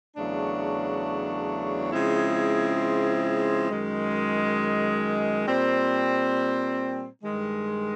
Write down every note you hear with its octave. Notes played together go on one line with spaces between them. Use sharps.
E2 C#3 F#3 A3 D4
C#3 F3 G#3 C4 E4
F#2 D#3 G#3
A#2 G3 C4
G2 D#3 G#3